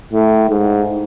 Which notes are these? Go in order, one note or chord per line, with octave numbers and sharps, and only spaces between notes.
A2
G#2